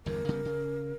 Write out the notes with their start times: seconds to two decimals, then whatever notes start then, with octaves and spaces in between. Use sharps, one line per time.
0.06 G1 E2 G2 A#4
0.29 C#3 G3 B3
0.45 C#3